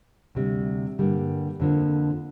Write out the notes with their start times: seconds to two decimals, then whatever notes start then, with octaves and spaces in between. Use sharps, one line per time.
0.35 D2 C3 G3
0.98 G2 D3 G3 A#3
1.60 F2 D3 F3 A#3